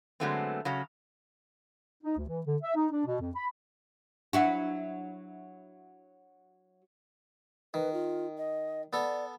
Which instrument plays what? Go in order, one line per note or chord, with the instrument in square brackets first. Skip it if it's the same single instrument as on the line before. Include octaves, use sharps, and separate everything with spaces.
[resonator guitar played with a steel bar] D3 F#3 G#3 A3 B3 C4
C#3 F#3 C#4
[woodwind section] D#4
D2
E3
D3
E5
D#4
D4
B2
F2
B5
[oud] F#3 E4 F#4 [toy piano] D4 F#5
[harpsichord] D#3 [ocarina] B4
[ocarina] F4
D#5
[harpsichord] B3 A4 [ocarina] D5